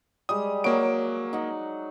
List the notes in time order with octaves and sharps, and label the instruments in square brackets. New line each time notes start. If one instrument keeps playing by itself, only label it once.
[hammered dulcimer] G3 G#3 G4 [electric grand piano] D#6
[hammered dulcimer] F#3 [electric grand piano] A#3 D7
[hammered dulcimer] D#4 F#5